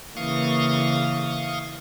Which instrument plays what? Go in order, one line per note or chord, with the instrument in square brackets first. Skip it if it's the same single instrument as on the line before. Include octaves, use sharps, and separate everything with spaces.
[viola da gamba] C#3 E3 A#3 [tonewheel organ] F5 C#6 D#6